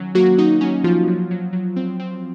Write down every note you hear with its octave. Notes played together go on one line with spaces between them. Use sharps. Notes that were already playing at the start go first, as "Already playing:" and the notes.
Already playing: D#3 F#3 C#4
F#3 A#3 F#4
F#3 D#4
F#3 C#4
F3 C#4 F4
F#3
F#3
F#3
C4
C4